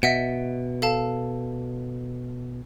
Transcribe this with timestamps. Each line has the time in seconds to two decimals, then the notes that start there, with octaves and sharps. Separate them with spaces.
0.03 B2 D#5 E5 F#5
0.82 A4 F5 A5